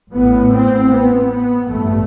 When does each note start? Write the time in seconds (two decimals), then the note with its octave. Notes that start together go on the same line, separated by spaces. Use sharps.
0.13 A1 A2 B3
0.52 C4
0.91 B3
1.30 B3
1.69 A1 G2 A3